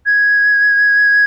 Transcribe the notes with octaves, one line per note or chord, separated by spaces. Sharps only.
G#6